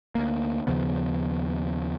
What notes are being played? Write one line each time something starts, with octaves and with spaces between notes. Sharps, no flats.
D2 A#3
D#2 C#3 F3 B3